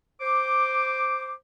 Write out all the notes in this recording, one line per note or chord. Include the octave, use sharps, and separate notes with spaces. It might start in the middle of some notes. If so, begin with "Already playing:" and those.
C5 D6